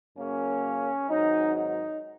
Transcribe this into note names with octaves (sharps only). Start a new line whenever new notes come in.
F#2 C#3 A#3 C#4
G#1 G#2 F#3 D#4
D#4